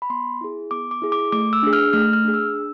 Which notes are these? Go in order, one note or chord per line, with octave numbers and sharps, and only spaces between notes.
B5
B3 C6
E4 G#4
B3 D6
D6
E4 G#4
D6
A3 D6
E6
D4 G#4
F6
A3 F6
F6
D4 G#4
E6
D4